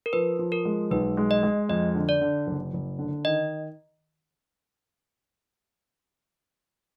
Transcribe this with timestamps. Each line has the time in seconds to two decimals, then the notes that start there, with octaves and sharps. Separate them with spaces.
0.06 A#4
0.13 F3 B4
0.39 F3
0.52 A#4
0.65 G#3
0.91 B1 B4
1.17 G#3
1.31 D#5
1.43 G#3
1.69 F2 D#5
1.95 D3
2.09 D5
2.21 D3
2.47 F#1
2.73 F#1
2.99 D3
3.25 D#3 D#5